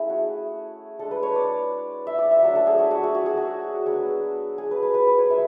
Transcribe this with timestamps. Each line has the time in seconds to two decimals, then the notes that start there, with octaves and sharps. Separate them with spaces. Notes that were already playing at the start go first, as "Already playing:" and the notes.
Already playing: A3 C#4 E4 G#4
0.09 F#4
0.99 G#3 D4 A4
1.11 B4
1.23 C#5
1.36 D5
2.07 E5
2.19 D5
2.31 E5
2.42 F#3 A3 D4 F#5
2.55 A4
2.67 G#4
2.78 F#4
2.91 F#4
3.03 G#4
3.15 F#4
3.26 G#4
3.37 F#4
3.86 F#3 B3 D4 G#4
4.58 G#4
4.71 B4
4.83 B4
4.94 B4
5.07 B4
5.18 C#5
5.30 G#3 E5